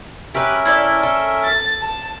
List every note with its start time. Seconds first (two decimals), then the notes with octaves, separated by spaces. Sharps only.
0.34 C#4 G4 A#4 B4 E5
0.65 E4 A4 D5
1.03 A4
1.43 A6
1.81 A5